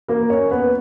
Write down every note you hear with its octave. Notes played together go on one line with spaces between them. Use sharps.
A#3 A#4
C#4 C#5
B3 B4